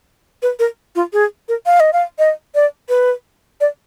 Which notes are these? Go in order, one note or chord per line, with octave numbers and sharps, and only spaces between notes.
B4
A#4
F4
G#4
A#4
F5
D#5
F5
D#5
D5
B4
D5